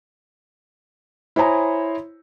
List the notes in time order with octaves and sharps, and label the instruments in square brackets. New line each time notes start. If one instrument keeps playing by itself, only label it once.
[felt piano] E4 C5 C#5 G#5 A#5 D#6